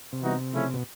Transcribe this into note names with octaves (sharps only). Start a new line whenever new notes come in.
C3
E3 G3 B3 D#4 F#4
C#3 F3 A3 C#4 E4
B2